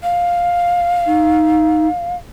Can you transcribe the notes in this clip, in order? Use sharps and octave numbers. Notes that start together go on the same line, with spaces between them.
F5
D#4